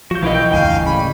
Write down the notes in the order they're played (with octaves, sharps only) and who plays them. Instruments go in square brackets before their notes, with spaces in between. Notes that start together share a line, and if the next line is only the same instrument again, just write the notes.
[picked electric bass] F3 [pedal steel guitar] F#4 G6
[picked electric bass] B1 F3 [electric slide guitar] E3 E4 D#5 [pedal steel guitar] B3 A#4 F5
[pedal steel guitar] G5 [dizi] G6
[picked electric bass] F1 D2 G2 [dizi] F5 [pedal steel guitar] G5 G#5 G6
[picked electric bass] A2 C#3 [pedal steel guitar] G3 [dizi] B5